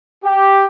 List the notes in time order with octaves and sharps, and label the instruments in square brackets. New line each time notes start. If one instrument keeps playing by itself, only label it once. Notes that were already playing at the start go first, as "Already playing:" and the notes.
[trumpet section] G4